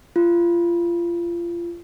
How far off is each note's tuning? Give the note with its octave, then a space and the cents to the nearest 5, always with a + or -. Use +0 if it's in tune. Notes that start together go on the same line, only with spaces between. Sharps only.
F4 -25